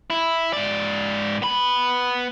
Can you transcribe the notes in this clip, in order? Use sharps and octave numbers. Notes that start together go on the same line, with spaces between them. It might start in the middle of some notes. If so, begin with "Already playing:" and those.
E4
G#2 D5
B3 B5